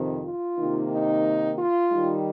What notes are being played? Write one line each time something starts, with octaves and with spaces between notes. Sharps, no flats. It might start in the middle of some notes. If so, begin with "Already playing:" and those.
Already playing: F2 C3 D#3
F4
C3 D#3 A#3 D#4
D#4
F4
D#3 G3 D#4